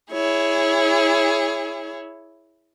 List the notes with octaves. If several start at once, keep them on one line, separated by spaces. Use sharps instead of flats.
E4 G#4 C#5